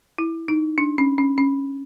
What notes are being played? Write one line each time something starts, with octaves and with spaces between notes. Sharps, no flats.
E4
D#4
D4
C#4
C#4
C#4